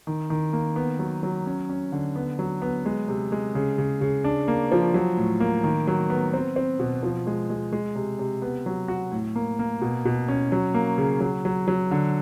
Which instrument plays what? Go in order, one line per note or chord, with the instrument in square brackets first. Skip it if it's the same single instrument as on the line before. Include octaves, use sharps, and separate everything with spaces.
[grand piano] D#3
D#3
A#3
B3
F#3
F#3
C#4
C#4
D3
B3
F#3
B3
G#3
C3
G#3
C#3
C#3
C#3
D4
A#3
F3
F#3
A2
A#3
D#3
F#3
B3
C4
C4
B2
F3
G#3
G#3
G#3
C3
C3
B3
F#3
F#4
A2
A#3
A#3
B2
B2
C#4
F#3
A#3
C#3
F#3
F#3
F#3
D3